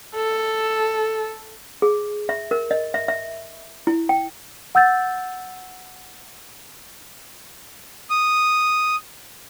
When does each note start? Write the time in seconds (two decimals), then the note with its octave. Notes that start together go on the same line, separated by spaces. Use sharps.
0.15 A4
1.82 G#4
2.29 E5
2.51 A#4
2.71 D#5
2.94 E5
3.08 E5
3.87 E4
4.09 G5
4.75 F#5 E6 G6 A6
8.10 D#6